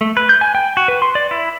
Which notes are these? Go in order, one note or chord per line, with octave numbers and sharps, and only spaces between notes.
A3
B4
G6
G#5
G5
F#4
B4
C6
D5
E4